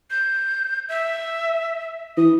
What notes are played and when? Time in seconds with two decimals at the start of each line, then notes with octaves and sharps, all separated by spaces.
0.10 G6
0.89 E5
2.17 E3 D#6